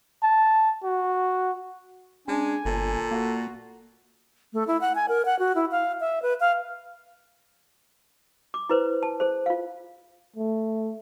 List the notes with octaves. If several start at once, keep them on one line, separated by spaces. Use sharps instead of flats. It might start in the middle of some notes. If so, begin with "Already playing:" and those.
A5
F#4
G#3 C#4 D4 G#5
G1 A#2 A4
A#3 F#4
A3
E4
F#5
G#5
A#4
F#5
F#4
E4
F5
E5
B4
F5
D6
E4 B4 C5
A5
G#4 C5
F4 F5
A3